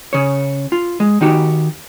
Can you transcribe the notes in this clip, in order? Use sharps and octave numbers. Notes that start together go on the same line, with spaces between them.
C#3 C#5
F4
G#3
D#3 D#4 F#4 G4